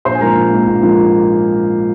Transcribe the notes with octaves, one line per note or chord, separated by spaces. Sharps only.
A#1 C5 C6
G#5
G#2 F3 A#3 A#4 A#5
A#1
G#2 F3 A#3
A#1
G#2 F3 A#3